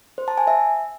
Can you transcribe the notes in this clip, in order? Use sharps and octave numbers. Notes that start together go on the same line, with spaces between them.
C5
A5
G#5
E5